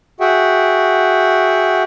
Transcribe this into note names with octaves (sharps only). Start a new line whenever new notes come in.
F#4 G#4 E5 F#5 G5